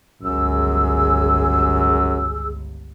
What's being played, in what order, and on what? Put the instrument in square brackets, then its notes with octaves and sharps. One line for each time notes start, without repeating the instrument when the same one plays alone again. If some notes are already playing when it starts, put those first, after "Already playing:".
[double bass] G1 C#2 [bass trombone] F#2 [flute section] G#4 E6